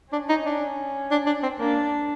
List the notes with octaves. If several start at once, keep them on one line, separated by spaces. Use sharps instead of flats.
C#4 D4
D#4
D4
D4
D4
C4
A#3 D4